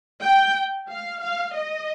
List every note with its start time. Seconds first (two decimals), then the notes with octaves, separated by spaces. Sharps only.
0.23 G5
0.90 F5
1.22 F5
1.55 D#5